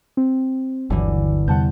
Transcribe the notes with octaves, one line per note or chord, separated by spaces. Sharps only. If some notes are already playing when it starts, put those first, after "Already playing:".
C4
G1 D#2 D3 E3 F#3
E2 C3 G3 F#5 A5 G6